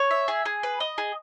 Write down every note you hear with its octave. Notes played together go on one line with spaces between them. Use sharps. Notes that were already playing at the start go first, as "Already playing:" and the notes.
Already playing: C#5
E5
G#4
G#4
B4
D#5
G#4